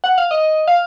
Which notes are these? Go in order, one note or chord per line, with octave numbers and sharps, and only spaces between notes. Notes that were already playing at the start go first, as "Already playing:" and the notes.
F#5
F5
D#5
F5